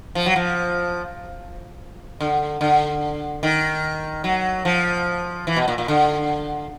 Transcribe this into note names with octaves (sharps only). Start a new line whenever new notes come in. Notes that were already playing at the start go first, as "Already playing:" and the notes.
F3
F#3
F3
D3
D3
D#3
F#3
F3
E3
B2
A#2
A#2
D3